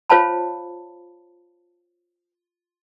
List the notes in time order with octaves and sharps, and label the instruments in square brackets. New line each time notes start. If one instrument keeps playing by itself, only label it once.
[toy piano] F4 C5 C#5 F5 A5 B5